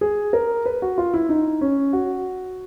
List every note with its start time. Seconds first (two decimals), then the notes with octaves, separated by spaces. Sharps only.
0.01 G#4
0.33 A#4
0.66 B4
0.82 F#4
0.98 F4
1.14 E4
1.29 D#4
1.61 C#4
1.93 F#4